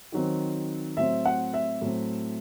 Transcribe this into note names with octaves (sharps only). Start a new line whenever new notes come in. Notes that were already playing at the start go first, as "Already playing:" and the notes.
D#3 F#3 C4
A2 F#3 C4 E5
F#5
E5
A2 F#3 C4